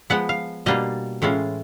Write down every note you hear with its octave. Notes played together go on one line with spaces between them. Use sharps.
F3 G#3 B3 F#5
F5
B2 G3 A#3 D4 F4 D#5
A2 E3 G#3 C#4 F4